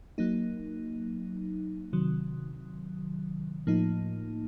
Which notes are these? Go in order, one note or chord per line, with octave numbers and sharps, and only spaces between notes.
F#3 A#3 D#4
C3 D#3 F#3
A2 F3 A#3 D#4